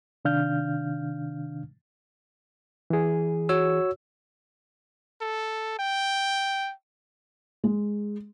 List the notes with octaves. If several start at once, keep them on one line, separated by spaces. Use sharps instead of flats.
C3 D#3 D4 F5 F6 G6
E3 G#4
F#4 C#5 E6
A4
G5
G#3